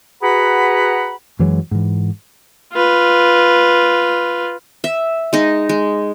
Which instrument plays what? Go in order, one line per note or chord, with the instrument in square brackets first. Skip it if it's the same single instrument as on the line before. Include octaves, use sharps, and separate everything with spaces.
[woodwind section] F#4 G#4 B4 F#5 A#5 B5
[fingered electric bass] F#2 E3 F#3 G#3
G#2 E3
[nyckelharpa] F4 B4
[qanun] E5
G#3 D#4
G#3